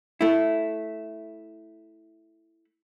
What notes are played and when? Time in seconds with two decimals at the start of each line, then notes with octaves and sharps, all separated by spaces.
0.21 A3 E4